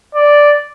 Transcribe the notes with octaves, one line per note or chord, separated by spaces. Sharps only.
D5